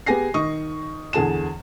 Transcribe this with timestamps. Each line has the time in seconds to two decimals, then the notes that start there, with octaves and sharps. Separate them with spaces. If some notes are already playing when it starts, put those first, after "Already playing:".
0.06 B3 G4 G#4 G#5 A#6 C7
0.34 D#3 D#5 C#6 D#6
1.13 E2 D3 G#4 A5 E7